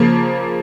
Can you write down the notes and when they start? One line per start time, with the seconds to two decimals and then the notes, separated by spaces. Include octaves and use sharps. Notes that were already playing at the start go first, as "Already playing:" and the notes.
Already playing: C#3 F3 A#3